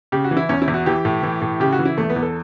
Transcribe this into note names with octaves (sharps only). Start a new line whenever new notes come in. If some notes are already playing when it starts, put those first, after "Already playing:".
C#3 G4
F#4
E3
E4
E2 C#4
E4
E2
F#4
E3 G4
A2
E3
A2
C#3 G4
F#4
E3
E4
E2 A3
B3
E2
A4